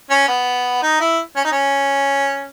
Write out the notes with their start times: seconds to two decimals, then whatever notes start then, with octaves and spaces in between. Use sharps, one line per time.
0.10 C#4
0.28 B3
0.83 D#4
1.00 E4
1.36 C#4
1.44 D#4
1.52 C#4